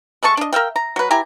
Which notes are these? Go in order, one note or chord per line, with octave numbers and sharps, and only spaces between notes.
G#3 A3 A5 C#6
D4 D#5
A#4 E5 F5 G5
A#5
F#3 B4
E4 G4 G#5 A#5